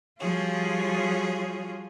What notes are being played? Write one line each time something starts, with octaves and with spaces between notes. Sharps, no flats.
F3 G3 F4 F#4 G#4 C#5